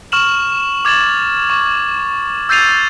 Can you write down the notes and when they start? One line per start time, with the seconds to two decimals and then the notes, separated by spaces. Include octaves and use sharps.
0.12 C#6 F6 E7 F#7
0.85 D6 G#6 A6 E7 F#7
1.50 C#6
2.49 E6 G6 A6 C7 D#7 F7